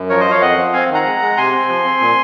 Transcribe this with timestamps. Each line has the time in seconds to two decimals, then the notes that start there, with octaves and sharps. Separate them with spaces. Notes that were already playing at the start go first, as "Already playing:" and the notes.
Already playing: F#2
0.09 F3 A#4 C#5
0.20 C5 D#5
0.26 F3
0.31 C#5 F5
0.41 F2 D#5 F#5
0.58 F3
0.73 C4 F5 G#5
0.89 D#3
0.94 F#5 A#5
1.05 G#3
1.21 G#3
1.37 C3 G#5 C6
1.53 C4
1.69 F3
1.84 C4
2.01 A#2